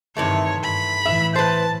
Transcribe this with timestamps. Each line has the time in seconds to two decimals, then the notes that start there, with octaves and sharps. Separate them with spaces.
0.17 G2 C3 D#3 E3 A3 C#5
0.63 G2 B5
1.05 A2 E3 E5
1.36 B4 C5 A5